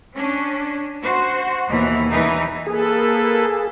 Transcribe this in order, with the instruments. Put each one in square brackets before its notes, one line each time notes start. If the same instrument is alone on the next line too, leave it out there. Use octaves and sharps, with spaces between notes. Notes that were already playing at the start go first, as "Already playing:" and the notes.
[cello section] C#4 D4
F#4 C5
D#2 B2 E3
E2 E3 D#4
[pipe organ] A#3 A4 B4 [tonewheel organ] G#4